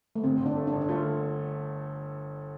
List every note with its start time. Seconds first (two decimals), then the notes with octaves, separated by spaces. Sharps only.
0.16 A3
0.24 G1 C4
0.40 G1
0.46 D4
0.56 A3
0.67 D4
0.73 G1
0.81 D4
0.89 A3 F4
1.05 D3